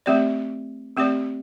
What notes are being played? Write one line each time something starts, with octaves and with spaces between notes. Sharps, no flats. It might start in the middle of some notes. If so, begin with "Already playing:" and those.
A3 C4 G4 D5
A3 C4 G4 D5